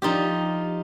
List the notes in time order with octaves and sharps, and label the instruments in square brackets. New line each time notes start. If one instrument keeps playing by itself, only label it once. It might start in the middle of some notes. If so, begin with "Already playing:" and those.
[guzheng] F3 D#4 F4 G4